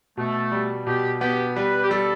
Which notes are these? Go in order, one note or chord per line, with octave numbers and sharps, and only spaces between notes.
B2 A3
G3
B2 G4
B3 G4
G3 B4
G4
G3 A4